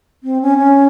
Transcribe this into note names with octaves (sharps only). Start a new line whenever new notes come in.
C4
C#4
C#4